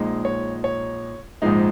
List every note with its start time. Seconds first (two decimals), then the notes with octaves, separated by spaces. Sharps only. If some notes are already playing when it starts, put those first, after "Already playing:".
Already playing: A#1 A#2 G#3 D#4
0.25 C#5
0.64 C#5
1.42 A#1 G#2 F3 G#3 D#4